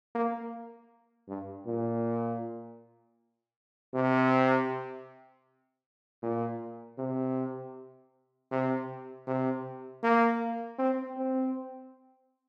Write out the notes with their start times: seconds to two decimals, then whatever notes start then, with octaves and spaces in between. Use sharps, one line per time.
0.15 A#3
1.28 G2
1.66 A#2
3.94 C3
6.22 A#2
6.99 C3
8.51 C3
9.27 C3
10.03 A#3
10.79 C4
11.17 C4